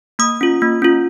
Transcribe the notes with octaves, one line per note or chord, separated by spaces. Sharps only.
A#3 D#6
C#4 F4
A#3
C#4 F4